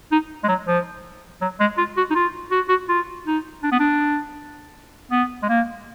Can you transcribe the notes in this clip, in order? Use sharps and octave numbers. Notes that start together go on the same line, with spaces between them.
D#4
G#3
F#3
F3
F#3
G#3
F4
F#4
D#4
F4
F#4
F#4
F4
D#4
D4
B3
D4
B3
G#3
A#3